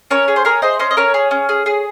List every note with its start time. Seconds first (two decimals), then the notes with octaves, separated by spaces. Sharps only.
0.11 C#4 A#4 C#5
0.28 G#4
0.36 C5
0.45 G#4 A#4 C#5
0.62 G#4 C5 D#5
0.79 C#4 C5 D#5
0.91 D#5
0.97 C#4 A#4 C#5
1.14 G#4
1.31 C#4
1.49 G#4
1.66 G#4